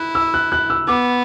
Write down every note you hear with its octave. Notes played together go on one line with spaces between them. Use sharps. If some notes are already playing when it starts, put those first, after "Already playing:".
Already playing: E4 F#6
E6
F#6
F#6
E6
B3 D6